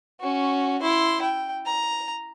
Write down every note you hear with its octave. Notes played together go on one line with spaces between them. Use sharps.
C#4 F#4
E4 C6
G5
A#5